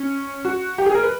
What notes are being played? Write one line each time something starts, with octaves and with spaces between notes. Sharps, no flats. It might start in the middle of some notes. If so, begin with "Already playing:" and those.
Already playing: C#4
F#4
G4
G#4
A#4
B4